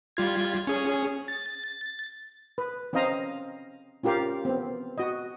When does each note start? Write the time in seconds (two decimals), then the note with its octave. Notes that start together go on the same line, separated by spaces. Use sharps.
0.17 G3 F4 G#6
0.67 C#4 G#4
1.28 A6
2.58 B4
2.93 C4 C#4 C5 D#5 F5 A#5
4.03 C#4 F4 G4 A#4 F5
4.45 B3 C4
4.98 F#4 D#5